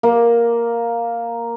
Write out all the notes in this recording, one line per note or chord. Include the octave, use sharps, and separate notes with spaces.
A#3